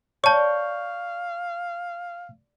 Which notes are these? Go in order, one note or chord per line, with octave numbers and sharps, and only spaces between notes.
C#5 D5 F5 A5 C#6 G6